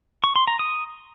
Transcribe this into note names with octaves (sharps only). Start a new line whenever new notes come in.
C#6
C6
A#5
D#6